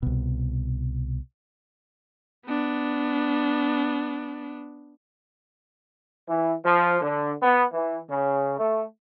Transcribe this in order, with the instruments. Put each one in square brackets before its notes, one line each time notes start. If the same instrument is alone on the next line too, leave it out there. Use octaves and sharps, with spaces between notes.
[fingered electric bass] C2 B2
[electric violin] B3 D4
[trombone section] E3
F3
D3
B3
E3
C#3
A3